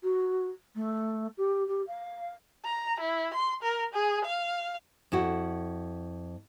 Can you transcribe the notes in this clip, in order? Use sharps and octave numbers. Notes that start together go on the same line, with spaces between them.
F#4
A3
G4
G4
F5
A#5
E4
C6
A#4
G#4
F5
F2 E4 F#4